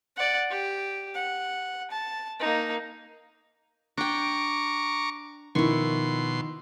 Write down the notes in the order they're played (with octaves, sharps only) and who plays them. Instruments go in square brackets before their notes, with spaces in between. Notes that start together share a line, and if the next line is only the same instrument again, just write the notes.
[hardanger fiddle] D5 F#5
G4
F#5
A5
A#3 D#4
[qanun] D4 G5 [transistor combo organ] A#5 C#6 D6
[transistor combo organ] B2 C6 [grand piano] D#3 F3 [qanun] E4 C#6